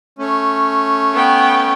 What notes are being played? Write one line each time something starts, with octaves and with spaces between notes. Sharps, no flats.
A3 C#4
B3 G5